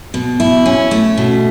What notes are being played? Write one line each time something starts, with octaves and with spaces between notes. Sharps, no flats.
B2
E4
C#4
A3
B2